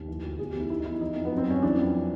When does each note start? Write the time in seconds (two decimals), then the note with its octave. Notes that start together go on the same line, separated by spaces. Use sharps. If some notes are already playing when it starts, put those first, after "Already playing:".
Already playing: D#2
0.08 E3
0.23 D2
0.39 E2 G#4
0.49 G4
0.54 E2
0.60 E4
0.70 D#3 E4
0.80 D#4
0.85 E2 E4
1.01 E3 D#4
1.16 F2
1.25 B3
1.32 F#2
1.37 C4
1.48 F#2 C#4
1.62 E3 D4
1.79 F2